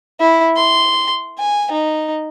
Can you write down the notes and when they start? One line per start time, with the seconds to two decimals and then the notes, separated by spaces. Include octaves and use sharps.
0.20 E4
0.56 C6
1.38 G#5
1.71 D#4